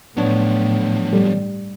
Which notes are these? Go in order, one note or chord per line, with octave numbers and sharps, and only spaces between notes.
A2 F3 F#3 B3 D4 C#5
G3